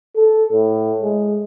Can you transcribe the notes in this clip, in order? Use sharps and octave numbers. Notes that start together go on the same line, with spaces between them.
A4
A2
G#3